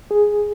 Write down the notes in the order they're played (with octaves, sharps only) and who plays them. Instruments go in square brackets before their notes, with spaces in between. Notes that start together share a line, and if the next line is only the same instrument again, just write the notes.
[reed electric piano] G#4